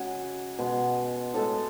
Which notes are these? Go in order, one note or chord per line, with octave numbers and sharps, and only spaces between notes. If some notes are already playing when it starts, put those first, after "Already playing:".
Already playing: C#3 G#3 F#4 G#4
B2 G#3
A2 G#3 A4